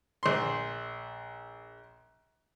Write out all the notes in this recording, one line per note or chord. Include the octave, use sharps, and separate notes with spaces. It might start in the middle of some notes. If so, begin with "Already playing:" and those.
A#1 C6